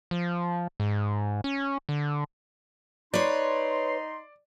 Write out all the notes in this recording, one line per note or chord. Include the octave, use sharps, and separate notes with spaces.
F3
G#2
C#4
D3
D#4 B4 C#5 D5 C6